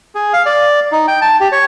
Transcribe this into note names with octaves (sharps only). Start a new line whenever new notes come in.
G#4
F5
D5
D#4
G5
A5
G4
C#5